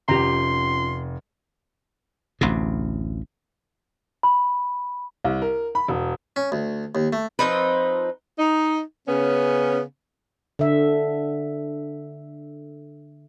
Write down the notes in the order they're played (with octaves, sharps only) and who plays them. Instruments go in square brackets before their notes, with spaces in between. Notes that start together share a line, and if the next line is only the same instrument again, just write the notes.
[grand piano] F1 [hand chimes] C#4 F4 [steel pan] G4 A#5 [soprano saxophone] C6
[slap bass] A1 D2 C3
[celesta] B5
[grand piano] C2
A#4
B5
E1
[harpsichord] C#4
D2
D#2
A3
[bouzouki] F3 C4 D#4 B4
[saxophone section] D#4
C#3 B3 C#4
[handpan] D3 E5